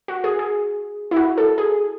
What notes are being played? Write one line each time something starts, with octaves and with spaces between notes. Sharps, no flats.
F#4
G#4
G#4
E4
F#4
A4
G#4